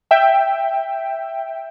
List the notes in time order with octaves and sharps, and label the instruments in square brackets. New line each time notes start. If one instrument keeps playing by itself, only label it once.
[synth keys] E5 G5